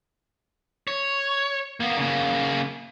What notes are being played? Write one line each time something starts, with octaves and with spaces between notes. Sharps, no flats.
C#5
A#3 B3
C#3 A#3